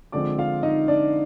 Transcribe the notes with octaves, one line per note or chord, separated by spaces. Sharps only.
D3 F3 G#3 C4 D5 D6
F4 F5
D#4 D#5
D4 D5